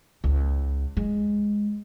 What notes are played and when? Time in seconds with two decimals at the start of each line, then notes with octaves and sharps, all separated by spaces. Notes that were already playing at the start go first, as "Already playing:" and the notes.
0.24 C#2
0.97 G#3